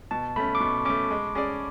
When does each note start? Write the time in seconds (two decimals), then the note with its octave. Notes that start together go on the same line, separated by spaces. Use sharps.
0.11 B2 A5
0.36 A3 C#4 B5
0.55 D6
0.60 B2 C#6
0.85 A3 C#4 D6
1.11 G#3
1.35 C#4 G#4 D5